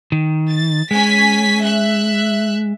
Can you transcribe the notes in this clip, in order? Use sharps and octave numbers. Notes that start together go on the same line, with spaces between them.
D#3
A6
G#3 C#4 G#5 B6
E5 F#6